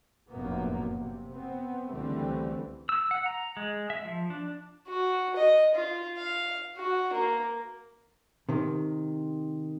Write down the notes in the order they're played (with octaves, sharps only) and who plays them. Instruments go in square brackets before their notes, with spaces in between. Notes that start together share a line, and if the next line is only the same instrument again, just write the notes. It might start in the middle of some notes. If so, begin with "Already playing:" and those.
[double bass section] F1 F#2 A2 A#3 B3
C3
B3 C4
C#2 D3 E3 G3 A3 C4
[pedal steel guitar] E6
F#5
A#5
G#3
E5
F3
D4
[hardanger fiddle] F#4
D#5
F4
F5
F#4
A#3
[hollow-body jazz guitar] C3 D#3